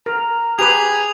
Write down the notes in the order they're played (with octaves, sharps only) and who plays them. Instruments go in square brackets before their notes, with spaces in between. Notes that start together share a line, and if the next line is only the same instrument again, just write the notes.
[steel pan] A#4 [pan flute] A#5
[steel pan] G4 B4 [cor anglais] G#4 [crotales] D#6 F7